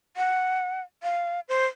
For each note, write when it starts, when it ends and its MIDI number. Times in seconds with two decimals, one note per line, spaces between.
0.17 0.81 78
1.03 1.40 77
1.49 1.66 72